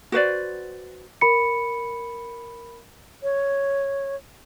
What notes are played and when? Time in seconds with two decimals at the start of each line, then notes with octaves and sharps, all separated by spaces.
0.12 F#4 B4 C5 D5
1.21 A#4 B5 C#7
3.23 C#5